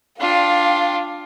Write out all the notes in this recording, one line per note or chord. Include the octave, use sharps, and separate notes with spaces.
D4 F4 F5 G5